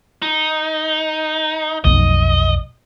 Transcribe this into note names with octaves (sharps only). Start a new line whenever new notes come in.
D#4
F1 B1 D#5